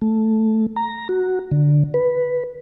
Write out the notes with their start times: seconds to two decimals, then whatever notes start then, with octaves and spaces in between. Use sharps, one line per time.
0.02 A3
0.76 A#5
1.09 F#4
1.51 D3
1.94 B4